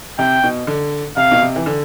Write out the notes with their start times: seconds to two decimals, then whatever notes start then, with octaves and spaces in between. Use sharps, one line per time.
0.18 C3 G5
0.44 B2
0.67 D3
1.17 C3 F5
1.32 B2
1.42 C3
1.56 E3
1.66 D3